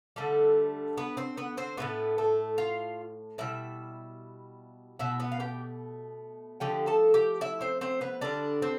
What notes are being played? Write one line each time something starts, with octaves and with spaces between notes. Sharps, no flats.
D3 G3 A3 A4
B3 B4
C4 C5
B3 B4
C4 C5
A2 F3 A3 B3 B4
A3 A4
F4 F5
B2 G3 E4 E5
B2 A3 E4 E5
B3 B4
F5
G4 G5
D3 F3 A3 G4 G5
A4 A5
G4 G5
E4 E5
C4 C5
C4 C5
B3 B4
D3 G3 D4 D5
C4 C5